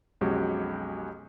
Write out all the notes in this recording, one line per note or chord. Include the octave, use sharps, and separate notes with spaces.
B1 F2 G#3 C#4 F#4 G4